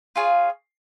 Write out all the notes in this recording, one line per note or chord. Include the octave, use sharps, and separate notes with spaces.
F4 G#4 C#5 F5